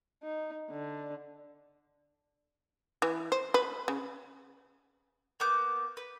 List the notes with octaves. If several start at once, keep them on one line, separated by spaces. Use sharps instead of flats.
D#4
D3
E3
C5
B4
C#3
A#3 B3 D6 G6
B4